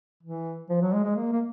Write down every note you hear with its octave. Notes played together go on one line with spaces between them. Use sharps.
E3
F3
F#3
G#3
G#3
A#3
A#3